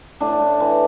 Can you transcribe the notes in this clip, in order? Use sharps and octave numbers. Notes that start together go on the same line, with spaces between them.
A2 D4
A2
E3